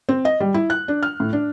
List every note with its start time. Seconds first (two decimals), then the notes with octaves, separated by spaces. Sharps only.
0.09 C4
0.25 D#5
0.40 G3
0.54 E4
0.70 F#6
0.88 D4
1.03 F6
1.20 A2
1.33 D4